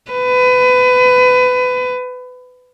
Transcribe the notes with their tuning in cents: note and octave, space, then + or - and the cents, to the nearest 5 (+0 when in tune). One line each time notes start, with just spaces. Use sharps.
B4 +25